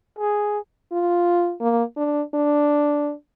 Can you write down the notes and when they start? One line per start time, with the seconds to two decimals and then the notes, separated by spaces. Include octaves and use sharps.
0.19 G#4
0.92 F4
1.61 A#3
1.96 D4
2.34 D4